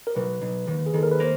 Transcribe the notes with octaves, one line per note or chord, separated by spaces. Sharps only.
A#4
B1 B4
B1
D#2
G#4
D#2 A4
A#4
B4
A#3 C5